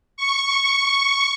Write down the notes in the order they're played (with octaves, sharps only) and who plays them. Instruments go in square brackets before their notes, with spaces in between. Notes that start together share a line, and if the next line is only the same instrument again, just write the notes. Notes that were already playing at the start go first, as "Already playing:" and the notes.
[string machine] C#6